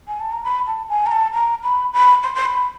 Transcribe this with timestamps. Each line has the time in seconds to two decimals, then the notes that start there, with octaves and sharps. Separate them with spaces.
0.08 G#5
0.20 A5
0.32 A#5
0.44 B5
0.67 A5
0.89 G#5
1.06 A#5
1.12 A5
1.34 A#5
1.64 B5
1.93 B5
2.23 C6
2.35 C6
2.45 B5